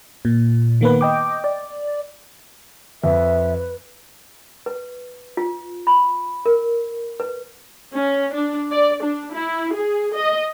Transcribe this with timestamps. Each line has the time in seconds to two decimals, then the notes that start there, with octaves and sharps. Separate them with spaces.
0.25 A#2
0.81 D#3 A#3 B3 B4
1.01 D#5 G5 D6
1.44 D5
3.04 F2 B4 E5
4.66 B4
5.37 F4
5.87 B5
6.46 A#4
7.20 B4
7.94 C#4
8.34 D4
8.72 D5
9.03 D4
9.34 E4
9.75 G#4
10.15 D#5